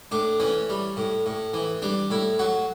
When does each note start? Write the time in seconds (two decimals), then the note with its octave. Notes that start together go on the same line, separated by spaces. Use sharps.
0.11 A2 D4
0.40 E3 C#4
0.69 G3
0.97 A2
1.26 A2
1.54 E3
1.82 G3 D4
2.11 A2 E4
2.39 F#3 F#4